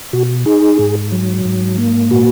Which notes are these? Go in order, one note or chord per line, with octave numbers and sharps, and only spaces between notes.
B2 F#4
D#4 G#4
G#2
F#3
G#2
A#3
A#2 F#4